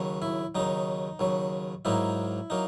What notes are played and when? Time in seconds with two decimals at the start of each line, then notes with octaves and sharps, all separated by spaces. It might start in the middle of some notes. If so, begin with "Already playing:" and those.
Already playing: D#2 C#3 F#3
0.22 E4
0.55 D#2 C#3 F#3 D#4
1.19 D#2 C#3 F#3
1.85 G#2 F#3 A#3 D#4 E4
2.50 F#3 A#3 D#4